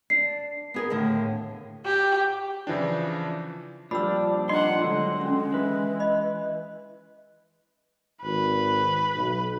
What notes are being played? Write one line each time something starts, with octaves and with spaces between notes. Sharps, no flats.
D4 C7
B3 G#4 A#4
D#2 A2 D3
G4
C#3 E3 F3 D4
A#2 F3 G3 D4 B5 E6
D4 D#5 F#5 A#5 C6
D3 F#3 G#3
C#4
E3 B4
D#5 B5
G#1 B4
B1